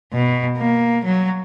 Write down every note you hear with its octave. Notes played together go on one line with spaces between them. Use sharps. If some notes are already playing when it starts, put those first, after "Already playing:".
B2
A#3
F#3